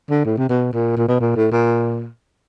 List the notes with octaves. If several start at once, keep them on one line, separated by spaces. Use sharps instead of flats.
D3
A2
C3
B2
A#2
A#2
B2
A#2
A2
A#2